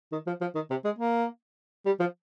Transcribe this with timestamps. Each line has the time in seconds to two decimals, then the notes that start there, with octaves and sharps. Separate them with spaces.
0.12 D#3
0.27 F3
0.41 F3
0.55 D#3
0.70 C3
0.84 G#3
0.99 A#3
1.86 G3
2.00 F3